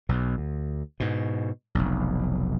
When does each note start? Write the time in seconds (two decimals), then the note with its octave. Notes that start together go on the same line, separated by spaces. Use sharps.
0.09 B1 B2
0.38 D2
1.00 G#2 B2
1.75 F1 B1